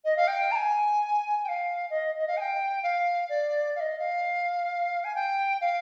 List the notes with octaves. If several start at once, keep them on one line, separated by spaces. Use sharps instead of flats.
D#5
F5
G5
A#5
G#5
G5
F5
D#5
D#5
F5
G#5
G5
F5
D5
F5
D#5
F5
G#5
G5
F5